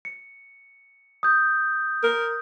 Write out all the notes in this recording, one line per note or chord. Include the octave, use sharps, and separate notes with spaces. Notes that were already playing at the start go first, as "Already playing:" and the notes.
C#7
D#6 G6
A#4